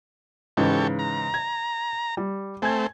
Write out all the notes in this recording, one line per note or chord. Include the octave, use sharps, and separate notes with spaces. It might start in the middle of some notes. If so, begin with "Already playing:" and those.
G#2 C#3 E3 G4 A4 C#5
A#5
G#6
G3
A3 C4 G#5 G#6